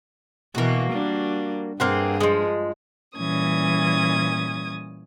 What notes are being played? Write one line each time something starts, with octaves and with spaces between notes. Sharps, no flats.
B2 E3 A#3 F#4
G3 D4
G2 A#3 C4 G#4 F#5
F3 G#3
A#2 E3 G3 C#4 D#6 G#6